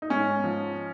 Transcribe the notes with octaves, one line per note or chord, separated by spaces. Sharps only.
D#4
G#2 C#4
F3